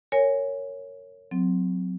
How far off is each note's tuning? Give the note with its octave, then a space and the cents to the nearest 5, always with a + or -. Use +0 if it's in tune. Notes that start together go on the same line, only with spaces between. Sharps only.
A#4 -20 C#5 +0 G#5 -5
F#3 -20 C4 -20